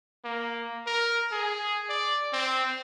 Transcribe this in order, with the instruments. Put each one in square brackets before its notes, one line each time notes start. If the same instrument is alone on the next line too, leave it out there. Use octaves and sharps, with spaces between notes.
[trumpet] A#3
A#4
G#4
D5
C4